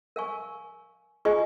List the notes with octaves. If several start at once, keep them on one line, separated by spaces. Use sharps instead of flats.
A#4 F5 G#5 C#6
F4 G#4 D#5 G#5 C#6